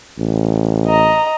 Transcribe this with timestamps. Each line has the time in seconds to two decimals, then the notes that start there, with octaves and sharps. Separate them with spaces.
0.19 A1
0.87 D#5 A#5